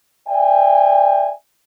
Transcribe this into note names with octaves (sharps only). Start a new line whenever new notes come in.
D5 E5 G5 G#5